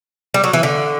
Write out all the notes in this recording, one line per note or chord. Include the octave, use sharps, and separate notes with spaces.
G3
F#3
E3
D3